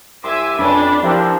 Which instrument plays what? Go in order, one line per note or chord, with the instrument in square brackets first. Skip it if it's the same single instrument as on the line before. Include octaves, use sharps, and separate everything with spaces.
[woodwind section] C2 D6 [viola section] E5 G#5 [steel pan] C6
[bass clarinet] F2 [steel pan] C#4 B4 [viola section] D4 [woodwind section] F4 B5 D6
[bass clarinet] F3 [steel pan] E4 G4 E5 [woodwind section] F4 A#4 C5